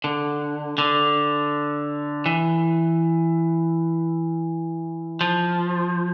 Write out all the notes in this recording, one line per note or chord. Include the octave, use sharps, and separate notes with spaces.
D3
D3
E3
F3